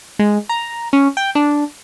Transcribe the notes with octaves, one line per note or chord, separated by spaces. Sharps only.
G#3
A#5
C#4
G5
D4